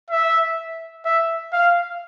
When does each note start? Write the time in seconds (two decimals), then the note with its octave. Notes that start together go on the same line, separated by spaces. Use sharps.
0.10 E5
1.05 E5
1.53 F5